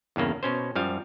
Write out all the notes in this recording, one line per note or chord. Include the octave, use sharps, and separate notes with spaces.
E2 G2 C#3 A#3
B2 C#4 C5
F#2 F3 G3 F5